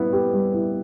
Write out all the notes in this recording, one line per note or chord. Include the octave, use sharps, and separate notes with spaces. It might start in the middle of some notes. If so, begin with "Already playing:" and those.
Already playing: G3 B3 E4
G4
G3
E4